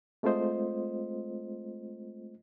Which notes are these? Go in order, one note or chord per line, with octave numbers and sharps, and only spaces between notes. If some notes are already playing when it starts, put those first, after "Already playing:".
G#3 A3 C4 F4 C5 D#5